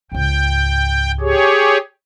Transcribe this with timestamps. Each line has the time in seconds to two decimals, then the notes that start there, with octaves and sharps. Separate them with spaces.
0.12 C#2 G#2 G5
1.20 G4 G#4 C#5